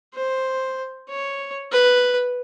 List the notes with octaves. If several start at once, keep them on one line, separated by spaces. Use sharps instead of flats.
C5
C#5
B4